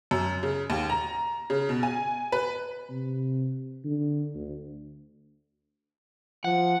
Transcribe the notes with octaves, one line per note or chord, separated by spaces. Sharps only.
F#2
C#3
D#2
A#5
C#3
B2
G#5
B4
C3
D3
D2
F3 F#5